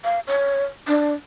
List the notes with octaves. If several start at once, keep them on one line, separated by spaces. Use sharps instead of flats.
F5
C#5
D4